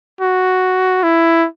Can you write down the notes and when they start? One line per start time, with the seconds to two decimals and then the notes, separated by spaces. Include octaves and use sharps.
0.21 F#4
1.03 E4